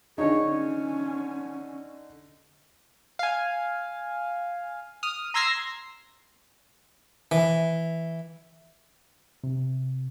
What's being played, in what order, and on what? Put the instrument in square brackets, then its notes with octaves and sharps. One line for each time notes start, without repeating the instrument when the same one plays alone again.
[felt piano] D3 D#4 [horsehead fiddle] G#4 C#5
[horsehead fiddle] C#4
[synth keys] F5 G#5
D#6 F6
A#5 C6 E6 G#6 A#6 C7
[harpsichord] E3
[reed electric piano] C3